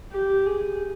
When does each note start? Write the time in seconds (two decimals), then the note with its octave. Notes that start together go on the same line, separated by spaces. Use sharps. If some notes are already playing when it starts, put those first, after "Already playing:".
0.12 G4
0.46 G#4